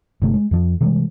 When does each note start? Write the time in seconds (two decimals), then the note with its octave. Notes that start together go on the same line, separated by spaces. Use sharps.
0.22 G1 C3 A3
0.34 G#3
0.51 F2 F3
0.81 C3 E3 G3 G#3